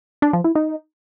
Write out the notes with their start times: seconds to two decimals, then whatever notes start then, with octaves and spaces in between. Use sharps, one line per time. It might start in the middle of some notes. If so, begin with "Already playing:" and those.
0.22 D4
0.33 F3
0.44 E4
0.55 D#4